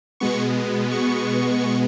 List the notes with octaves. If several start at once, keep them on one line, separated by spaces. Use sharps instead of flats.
B2 G#3 B3 C#6
C#6